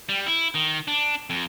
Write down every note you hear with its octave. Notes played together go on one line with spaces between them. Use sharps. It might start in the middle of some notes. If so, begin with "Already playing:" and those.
G3
E4
D#3
D4
F2